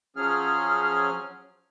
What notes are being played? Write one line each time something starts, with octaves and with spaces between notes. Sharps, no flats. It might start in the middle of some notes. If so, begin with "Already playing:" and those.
F3 F#3 C#4 G#4 F6